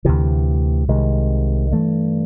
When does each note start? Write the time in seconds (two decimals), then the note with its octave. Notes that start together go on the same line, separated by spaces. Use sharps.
0.05 D2 C3 E3
0.88 C2 C3 D#3 G#3
1.71 G2 E3 A3